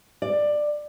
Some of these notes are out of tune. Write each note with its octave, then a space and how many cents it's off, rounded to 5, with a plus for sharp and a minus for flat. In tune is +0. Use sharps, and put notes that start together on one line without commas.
D5 +15